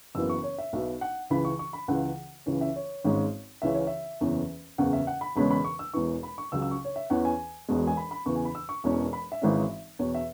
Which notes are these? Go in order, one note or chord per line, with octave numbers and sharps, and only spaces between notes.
F#1 F#2 C#3 E3 B3 E6
C#6
C#5
E5
B1 B2 B3
F#5
C#2 C#3 E3 B5
C#6
C#6
B5
C#2 C#3 E3 F#5
C#2 C#3 E3 C#4 C#5
E5
C#5
G#1 G#2 G#3 C#4
C#2 C#3 E3 C#4 E5
C#5
E5
F#1 E2 E3 C#4
F#1 E2 C#3 F#5
E5
F#5
B5
E1 E2 C#3 G#3 C#4 B5
B5
C#6
E6
E1 E2 E3 C#6
B5
C#6
C#2 C#3 F#3 E6
E6
C#6
C#5
E5
E2 E3 C#4 F#5
G#5
E1 E2 B2 G#3
G#5
B5
B5
E2 C#3 E3 C#6
G#5
B5
E6
C#6
E1 E2 E3 C#4
B5
E5
G#1 G#2 E3 G#3 C#4
E2 B2 B3 C#5
E5